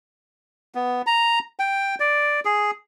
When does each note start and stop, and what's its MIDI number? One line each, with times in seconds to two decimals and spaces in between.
0.75 1.02 59
1.07 1.39 82
1.59 1.95 79
2.00 2.40 74
2.45 2.71 68